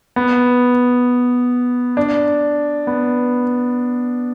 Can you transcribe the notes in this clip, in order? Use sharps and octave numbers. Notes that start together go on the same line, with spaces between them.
B3
D4
B3